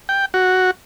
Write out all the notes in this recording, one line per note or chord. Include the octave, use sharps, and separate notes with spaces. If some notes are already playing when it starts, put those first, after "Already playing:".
G5
F#4